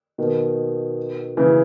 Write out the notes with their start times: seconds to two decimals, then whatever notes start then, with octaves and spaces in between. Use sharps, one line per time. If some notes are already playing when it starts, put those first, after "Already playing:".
0.18 B2 D#3
1.37 C#3 E3